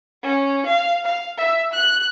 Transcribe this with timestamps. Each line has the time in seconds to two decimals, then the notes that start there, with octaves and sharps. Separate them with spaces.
0.23 C#4
0.66 F5
1.05 F5
1.37 E5
1.73 F#6